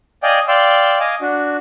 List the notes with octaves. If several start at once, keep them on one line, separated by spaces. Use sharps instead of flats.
D5 D#5 F5 G5 G#5 D#6
D5 F5 G5 C6 E6
D#5 F5 G#5 D6
D4 F#4